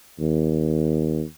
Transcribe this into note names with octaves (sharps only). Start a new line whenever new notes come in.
D#2